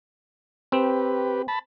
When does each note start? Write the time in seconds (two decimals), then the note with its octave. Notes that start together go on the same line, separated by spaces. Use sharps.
0.72 C4 G4 B4
1.48 A5 B5